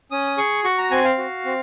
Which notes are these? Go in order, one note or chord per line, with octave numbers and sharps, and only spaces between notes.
C#4 D#6
G#4 C#6
F#4 C#6
A#5
C4 G#5
F5
F#4
C4